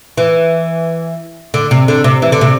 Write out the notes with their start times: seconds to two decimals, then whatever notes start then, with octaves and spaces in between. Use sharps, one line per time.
0.18 E3
1.54 D3
1.71 C3
1.88 D3
2.04 C3
2.22 E3
2.32 D3
2.41 C3